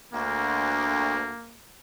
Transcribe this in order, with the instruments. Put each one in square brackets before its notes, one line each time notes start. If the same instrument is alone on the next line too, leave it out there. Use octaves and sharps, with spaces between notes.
[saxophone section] D2 [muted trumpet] A#3